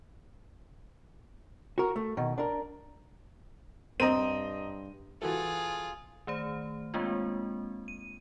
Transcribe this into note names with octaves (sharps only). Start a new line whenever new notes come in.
F#4 A#4
A3
B2 D#3
D4 A#4
G2 C4 D#5 A#5 D#7
E3 F4 F#4 G#4 A4
D#3 A3 C5
G#3 A#3 C4 D4 F4
D#7